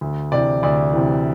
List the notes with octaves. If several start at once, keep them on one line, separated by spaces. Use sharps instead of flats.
D2
C3 E3 D5
D2 D5
C3 E3